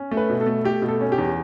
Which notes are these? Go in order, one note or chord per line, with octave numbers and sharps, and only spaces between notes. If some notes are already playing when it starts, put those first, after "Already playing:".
Already playing: C#4
A3
B4
B2
A4
A3
A3 G4
B2
A4
C#4
G4
E2